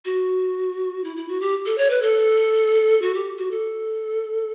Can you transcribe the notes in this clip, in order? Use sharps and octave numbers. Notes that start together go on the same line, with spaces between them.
F#4
E4
E4
F#4
G4
A4
C#5
B4
A4
F#4
G4
F#4
A4